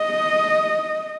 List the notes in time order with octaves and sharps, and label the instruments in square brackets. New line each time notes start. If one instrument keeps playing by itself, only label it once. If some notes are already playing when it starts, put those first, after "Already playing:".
Already playing: [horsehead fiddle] D#5